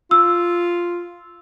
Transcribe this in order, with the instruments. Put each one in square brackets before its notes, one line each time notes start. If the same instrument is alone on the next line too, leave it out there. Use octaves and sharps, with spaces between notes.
[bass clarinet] F4 [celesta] E6